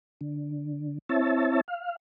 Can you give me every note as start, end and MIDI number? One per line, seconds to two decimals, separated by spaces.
0.21 0.98 50
1.09 1.61 60
1.09 1.61 64
1.09 1.61 73
1.09 1.61 76
1.09 1.61 81
1.68 1.96 77